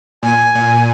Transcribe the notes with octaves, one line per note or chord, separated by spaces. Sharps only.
A#2 G#5
A#2